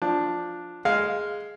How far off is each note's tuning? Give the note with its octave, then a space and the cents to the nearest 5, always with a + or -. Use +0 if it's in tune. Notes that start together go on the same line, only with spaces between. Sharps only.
F3 +0 D4 +0
G#3 +0 F5 +0